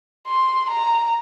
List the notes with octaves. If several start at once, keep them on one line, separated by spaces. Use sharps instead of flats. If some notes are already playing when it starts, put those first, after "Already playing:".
C6
A#5